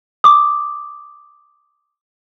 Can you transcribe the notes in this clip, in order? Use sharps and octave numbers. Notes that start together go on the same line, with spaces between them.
D6 D#6